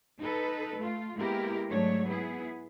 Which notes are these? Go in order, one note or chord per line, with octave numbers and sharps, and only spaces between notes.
D#4 A4 B4
A3 F4
G#3 A#3 B3 E4 G4 A#4
G#2 F#3 A3 D4 C#5
B3 E4 G#4